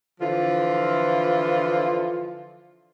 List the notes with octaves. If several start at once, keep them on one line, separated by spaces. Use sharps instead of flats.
D3 E3 F3 F4